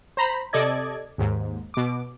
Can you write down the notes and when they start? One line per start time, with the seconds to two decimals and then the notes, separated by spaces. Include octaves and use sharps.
0.17 C5 A#5 B5
0.53 C3 A4 D5 D#5 G#6
1.18 D#2 G#2
1.74 B2 D6